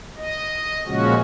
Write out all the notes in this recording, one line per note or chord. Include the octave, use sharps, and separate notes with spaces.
D#5
A#2 C#3 F3 G#3 C#4 F#4